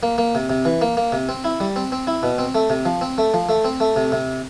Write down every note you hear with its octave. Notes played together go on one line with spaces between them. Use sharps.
A#3
A#3
C3
C3
E3
A#3
A#3
C3
C4
E4
G3
C4
C4
E4
B2
C4
A3
C3
F3
C4
A3
F3
A3
C4
A3
C3
C3